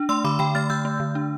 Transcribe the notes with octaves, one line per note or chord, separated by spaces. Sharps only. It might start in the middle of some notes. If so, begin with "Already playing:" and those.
Already playing: D4
A3 C6 E6
D3 B5 D6
D3 G5 B5
A3 F6 A6
D3 E6 G6
A3
D3
D4